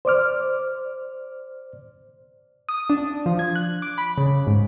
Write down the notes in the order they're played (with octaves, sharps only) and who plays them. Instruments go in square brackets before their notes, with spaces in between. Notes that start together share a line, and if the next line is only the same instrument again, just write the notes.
[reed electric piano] C5 D5 D6 F6
[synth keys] D#6
D4
F3
G#6
F#6
D6
B5
C#3
G#2